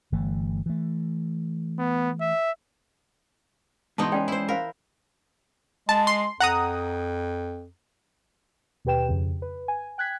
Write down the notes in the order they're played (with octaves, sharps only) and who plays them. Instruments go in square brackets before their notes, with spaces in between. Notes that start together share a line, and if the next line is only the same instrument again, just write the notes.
[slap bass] G1 E3 A3
E3 A3
[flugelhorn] B3
E5
[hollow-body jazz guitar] G#2 B2 [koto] E3 B3 D#4 [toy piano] A5 C6
[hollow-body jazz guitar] G#3 C#4 G#4 [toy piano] D5 G5 C6
[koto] E4 C5
[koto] A#4 [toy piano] C5 F5 B5
[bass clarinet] G#3 [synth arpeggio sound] A5
[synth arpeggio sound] C6
[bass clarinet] F2 [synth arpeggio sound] F#5 A#5 D#6
[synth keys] D#2 B2 G4 B4 G5 E7
F2 C#3
B4
G#5
G5 F#6 G#6 B6